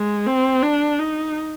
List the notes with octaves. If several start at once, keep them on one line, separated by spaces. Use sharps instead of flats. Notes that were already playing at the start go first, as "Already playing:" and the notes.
Already playing: G#3
C4
D4
D#4